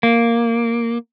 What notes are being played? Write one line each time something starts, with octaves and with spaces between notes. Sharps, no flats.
A#3